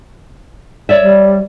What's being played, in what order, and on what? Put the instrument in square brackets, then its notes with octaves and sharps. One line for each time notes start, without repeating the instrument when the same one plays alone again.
[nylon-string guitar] C#5 D5 E5
[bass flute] G3